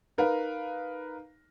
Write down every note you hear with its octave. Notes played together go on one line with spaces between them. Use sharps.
D#4 A#4 B4 F5